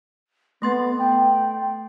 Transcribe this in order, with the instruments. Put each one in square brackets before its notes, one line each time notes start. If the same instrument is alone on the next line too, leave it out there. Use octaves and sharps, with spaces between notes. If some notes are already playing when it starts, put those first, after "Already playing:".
[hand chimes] A3 C6 A6 [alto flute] B3
[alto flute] G5